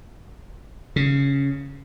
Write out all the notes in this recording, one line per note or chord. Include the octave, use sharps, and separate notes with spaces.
C#3